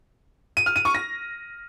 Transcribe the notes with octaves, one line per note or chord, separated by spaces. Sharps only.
D#7
F6
D#7
C#6
A#6